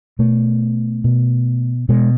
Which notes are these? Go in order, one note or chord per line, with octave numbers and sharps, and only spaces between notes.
B2 A3
B2
B2 G#3